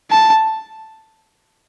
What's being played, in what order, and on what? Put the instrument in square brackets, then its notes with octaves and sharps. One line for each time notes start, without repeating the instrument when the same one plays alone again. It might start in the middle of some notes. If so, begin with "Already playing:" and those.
[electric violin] A5